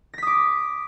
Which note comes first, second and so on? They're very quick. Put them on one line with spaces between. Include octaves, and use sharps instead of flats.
A#6 B6 D#6 D6